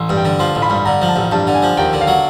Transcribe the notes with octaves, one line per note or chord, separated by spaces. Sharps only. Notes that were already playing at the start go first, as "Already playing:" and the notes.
Already playing: A1 C6
G2
G5
D3
F3 C6
A1
B5
G2
D3 A#5
F3
A5
A1
G2 A5
D3
G#5
F3
D#2 G5
D3
F5
F#3